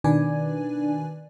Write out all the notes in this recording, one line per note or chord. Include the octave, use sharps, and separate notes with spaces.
B2 D#3 D4 B4 D5 G#5